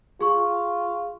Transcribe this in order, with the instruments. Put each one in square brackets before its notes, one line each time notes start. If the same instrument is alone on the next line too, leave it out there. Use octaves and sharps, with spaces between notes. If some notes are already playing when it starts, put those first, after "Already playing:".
[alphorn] F4 [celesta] G#4 C#6